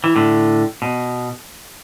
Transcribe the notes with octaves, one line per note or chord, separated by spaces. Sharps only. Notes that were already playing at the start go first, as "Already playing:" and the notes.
E3
A2 D3
B2